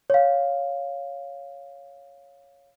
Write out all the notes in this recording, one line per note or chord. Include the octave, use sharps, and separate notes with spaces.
C#5 F5